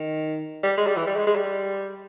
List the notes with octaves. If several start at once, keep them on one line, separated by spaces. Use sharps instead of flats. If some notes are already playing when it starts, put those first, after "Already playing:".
Already playing: D#3
G3
G#3
G3
E3
G3
G#3
G#3
G3